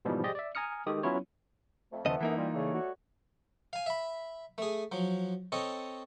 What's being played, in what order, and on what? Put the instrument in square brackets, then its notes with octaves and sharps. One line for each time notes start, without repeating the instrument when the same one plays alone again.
[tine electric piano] G#2 B2 E3 F3 G3 G#3
G4 G#4 C5 D5 D#5
D5 E5
G#5 A#5 D#6 F6 C#7
D#3 G#3 G4 A4 D#6
F#3 B3 C#4 E4 F4 C#5
[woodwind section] F2 [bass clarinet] A3
[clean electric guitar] D#2 C#3 D#5 [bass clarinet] F3 [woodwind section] A3 B3 E4
[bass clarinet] F#2 [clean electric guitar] E3 A#3 D#4
[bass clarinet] G3 [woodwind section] F4
[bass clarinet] C#3 [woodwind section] G3 A3 C#5
[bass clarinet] F#4
[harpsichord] F5 G#5
E5 B5
A3 G#4
F3 F#3
C4 A4 C#5 D#5